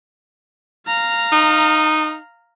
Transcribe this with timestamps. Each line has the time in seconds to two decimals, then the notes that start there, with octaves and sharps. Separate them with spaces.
0.87 F5 A#5
1.32 D#4